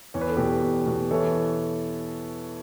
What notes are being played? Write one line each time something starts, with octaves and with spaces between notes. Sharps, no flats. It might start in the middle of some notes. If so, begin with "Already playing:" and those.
E2 C#5
B4
A4
B2 G4 B4
E2
B2
E3 A4 C#5